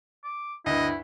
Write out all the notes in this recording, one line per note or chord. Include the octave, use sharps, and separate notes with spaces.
D6
D2 G2 E4 D#5